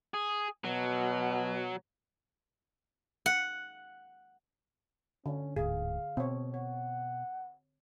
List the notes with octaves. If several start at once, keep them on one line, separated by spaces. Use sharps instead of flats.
G#4
B2 F#3
F#5
D3 C#4
D1 G#2 G#4 F5
B2 C4 C#5
C#5 F#5